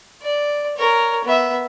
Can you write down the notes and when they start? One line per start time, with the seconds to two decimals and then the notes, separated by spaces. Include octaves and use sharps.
0.23 D5
0.77 A#4 C#5
1.25 B3 E5